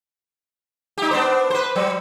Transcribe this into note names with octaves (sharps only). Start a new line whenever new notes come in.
D#4 G4
B3 D4 C5
B4 C5
F#3